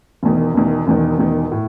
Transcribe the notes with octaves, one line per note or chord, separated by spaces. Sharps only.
E1 E2 D#3
E1 E2 D#3
E1 E2 D#3
E1 E2 D#3
A2